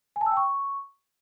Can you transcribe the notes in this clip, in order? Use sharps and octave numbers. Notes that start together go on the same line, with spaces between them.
G#5
A5
E6
G5
C#6